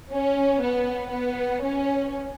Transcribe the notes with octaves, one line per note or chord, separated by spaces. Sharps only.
C#4
B3
B3
C#4